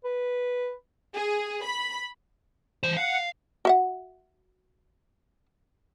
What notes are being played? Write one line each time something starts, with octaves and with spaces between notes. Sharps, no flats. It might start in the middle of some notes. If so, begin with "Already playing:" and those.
B4
G#4
B5
E3 C5
F5 F#5
F#4 E5 F#5